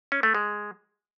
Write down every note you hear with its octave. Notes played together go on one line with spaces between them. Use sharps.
C#4
A3
G#3